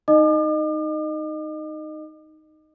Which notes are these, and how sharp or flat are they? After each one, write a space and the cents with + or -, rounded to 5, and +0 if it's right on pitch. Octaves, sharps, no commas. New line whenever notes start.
D#4 +0 D#5 -25 D6 +40